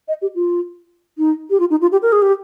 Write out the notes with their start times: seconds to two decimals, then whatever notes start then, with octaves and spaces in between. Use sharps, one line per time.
0.08 D#5
0.22 G4
0.35 F4
1.18 D#4
1.50 G4
1.60 F4
1.70 D#4
1.81 F4
1.92 G4
2.02 A#4
2.12 G#4
2.22 G4